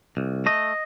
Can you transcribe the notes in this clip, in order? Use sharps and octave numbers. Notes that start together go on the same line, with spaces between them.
C2
A3 D#5